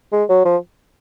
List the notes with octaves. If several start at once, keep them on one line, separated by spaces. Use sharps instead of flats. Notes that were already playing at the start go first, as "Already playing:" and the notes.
G#3
F#3
F3